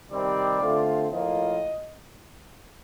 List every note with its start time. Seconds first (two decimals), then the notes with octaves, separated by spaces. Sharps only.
0.10 C3 D#3 G3 C4 D5
0.60 D3 A3 C4 F4
1.10 A2 F3 A#3 F4 D#5